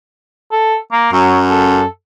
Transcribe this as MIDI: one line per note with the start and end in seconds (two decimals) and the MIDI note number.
0.52 0.77 69
0.92 1.10 58
1.13 1.84 42
1.13 1.40 54
1.51 1.86 69